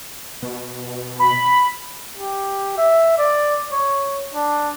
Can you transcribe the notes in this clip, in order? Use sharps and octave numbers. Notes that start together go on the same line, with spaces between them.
B2
B5
G4
E5
D5
C#5
D4